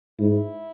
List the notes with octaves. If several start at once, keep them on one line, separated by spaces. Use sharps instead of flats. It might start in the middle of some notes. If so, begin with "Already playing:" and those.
G#2 E4